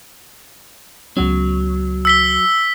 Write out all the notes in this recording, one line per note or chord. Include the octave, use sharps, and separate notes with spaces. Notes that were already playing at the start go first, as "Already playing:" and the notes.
C#2 F#3 B3 C#4
E6 B6 G7